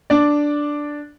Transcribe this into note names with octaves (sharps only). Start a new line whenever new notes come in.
D4 D5